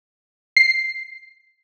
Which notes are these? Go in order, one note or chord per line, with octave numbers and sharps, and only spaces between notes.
C7